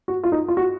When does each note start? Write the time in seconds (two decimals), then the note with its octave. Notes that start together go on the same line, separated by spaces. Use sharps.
0.08 F#4
0.24 F4
0.32 D#4
0.48 F4
0.57 F#4